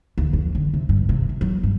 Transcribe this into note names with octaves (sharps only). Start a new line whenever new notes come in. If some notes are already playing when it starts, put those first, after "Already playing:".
D2
F2
D3
C3
G2
C3
C3
F#3
G2